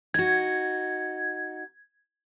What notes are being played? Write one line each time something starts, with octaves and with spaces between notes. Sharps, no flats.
D#4 F#4 G#6